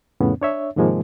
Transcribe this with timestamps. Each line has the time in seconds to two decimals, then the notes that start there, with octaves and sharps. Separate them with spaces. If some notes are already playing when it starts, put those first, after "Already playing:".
0.20 F2 A2 C#3 B3 C#4
0.41 D4 C#5 E5
0.76 G#2 C3 D#3 F3 G#3 A#3